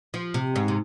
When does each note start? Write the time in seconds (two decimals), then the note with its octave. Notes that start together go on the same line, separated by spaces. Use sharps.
0.14 F3
0.34 C3
0.56 G#2
0.68 C3